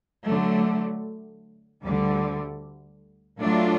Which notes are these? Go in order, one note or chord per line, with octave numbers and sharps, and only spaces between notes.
D3 F#3 A3
D2 D3 G3
A2 F#3 A3 D4 F4